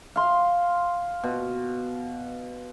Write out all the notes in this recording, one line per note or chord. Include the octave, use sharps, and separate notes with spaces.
F5 C6
B2